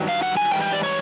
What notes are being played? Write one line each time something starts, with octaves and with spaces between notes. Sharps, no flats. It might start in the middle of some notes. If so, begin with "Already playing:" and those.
Already playing: G2 D#3 F#3
F5
F#5
G#5
G#2 E3 G3 G5
G5
D5
C#5